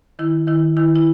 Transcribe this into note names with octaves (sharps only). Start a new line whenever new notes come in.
D#3 E4
D#3 E4
D#3 E4
E4